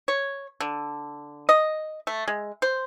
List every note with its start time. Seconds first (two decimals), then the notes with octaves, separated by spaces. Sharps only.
0.08 C#5
0.60 D3
1.49 D#5
2.07 A3
2.28 G#3
2.62 C5